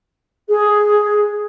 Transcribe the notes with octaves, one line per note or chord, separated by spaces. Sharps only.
G#4